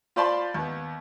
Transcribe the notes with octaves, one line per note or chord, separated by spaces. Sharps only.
F4 C5 D5 A5 B5 C6
D#2 B3